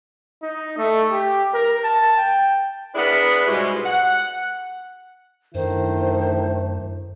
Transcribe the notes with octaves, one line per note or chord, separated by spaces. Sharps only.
D#4
A3
G4
A#4
A5
G5
B3 D4 E4 G#4 A#4 B4
G#2 B2 G3 G#3
F#5
F#2 D#3 A3 D4 E4 C5